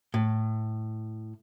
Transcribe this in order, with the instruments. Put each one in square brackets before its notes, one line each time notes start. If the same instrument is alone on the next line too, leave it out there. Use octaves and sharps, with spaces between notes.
[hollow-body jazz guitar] A2